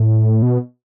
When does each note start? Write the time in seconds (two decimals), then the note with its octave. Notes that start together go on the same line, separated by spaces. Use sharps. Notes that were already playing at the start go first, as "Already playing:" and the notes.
Already playing: A2
0.42 B2